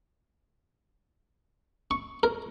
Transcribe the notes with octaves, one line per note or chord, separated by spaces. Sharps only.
C#6
A#4